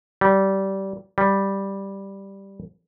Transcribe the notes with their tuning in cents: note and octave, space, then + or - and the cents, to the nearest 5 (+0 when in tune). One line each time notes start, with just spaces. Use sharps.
G3 -20
G3 +0